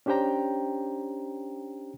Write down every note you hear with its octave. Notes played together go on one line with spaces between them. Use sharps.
C#4 D4 G4 C5 G5 A#5